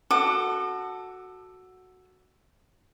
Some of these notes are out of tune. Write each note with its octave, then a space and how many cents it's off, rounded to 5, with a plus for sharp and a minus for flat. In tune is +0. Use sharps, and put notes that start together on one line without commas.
F#4 +0 A4 +0 D6 +40